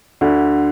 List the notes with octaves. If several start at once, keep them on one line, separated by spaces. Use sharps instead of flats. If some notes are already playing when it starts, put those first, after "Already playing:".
D2 D3